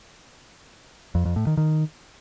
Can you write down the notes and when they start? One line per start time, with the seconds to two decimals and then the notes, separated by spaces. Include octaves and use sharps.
1.15 F2
1.25 F2
1.36 A2
1.47 D#3
1.57 D#3